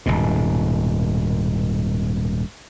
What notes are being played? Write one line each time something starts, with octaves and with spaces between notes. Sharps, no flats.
D#1 G#1 G#2 B2